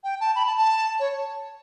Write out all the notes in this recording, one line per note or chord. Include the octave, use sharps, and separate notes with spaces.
G5
A5
B5
A5
A5
C#5